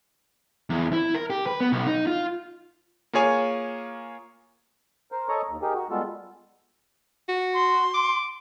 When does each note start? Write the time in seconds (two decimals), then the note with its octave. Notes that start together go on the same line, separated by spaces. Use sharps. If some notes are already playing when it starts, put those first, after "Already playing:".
0.70 E2
0.93 E4
1.14 A#4
1.30 G4
1.46 B4
1.61 B3
1.72 B1
1.87 D#4
2.07 F4
3.13 A#3 F4 G#4 C#5 G#5
5.12 A#4 C5
5.29 A4 C#5 D#5 A#5 C#6
5.49 D#2
5.62 D#4 G4 G#4 A#4
5.75 F#4
5.91 G3 G#3 B3 F4 A4
7.29 F#4
7.54 C6
7.94 D6